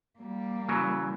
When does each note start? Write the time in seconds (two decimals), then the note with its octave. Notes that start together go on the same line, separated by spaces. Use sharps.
0.19 G3 A#3
0.69 C#3 E3 F#3